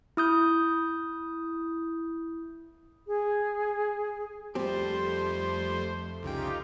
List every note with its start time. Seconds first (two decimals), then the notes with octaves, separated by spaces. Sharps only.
0.17 E4 D#6 G6
3.07 G#4
4.55 F2 F3 G3 A3 C4 G4 C5
6.23 C2 C#3 D#4 F4 G4 G5